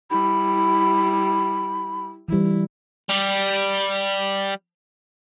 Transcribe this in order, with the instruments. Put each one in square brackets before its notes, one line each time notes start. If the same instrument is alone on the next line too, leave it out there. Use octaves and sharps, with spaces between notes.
[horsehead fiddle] G3 E4 [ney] B5
[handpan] E3 G3 [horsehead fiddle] E4
[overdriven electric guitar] G3 G4